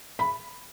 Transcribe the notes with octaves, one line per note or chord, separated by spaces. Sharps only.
B5